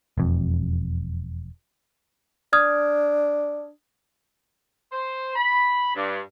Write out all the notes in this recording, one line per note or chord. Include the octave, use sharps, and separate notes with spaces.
E1 F2
D4 D#6 F6 G#6
C5
B5
G2